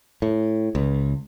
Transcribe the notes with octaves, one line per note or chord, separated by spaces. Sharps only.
A2
C#2